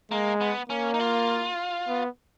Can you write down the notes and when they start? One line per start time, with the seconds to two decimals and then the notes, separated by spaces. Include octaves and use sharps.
0.11 G#3 A#3
0.41 B3
0.69 A#3 C#4
0.94 D#4
1.00 F4
1.88 B3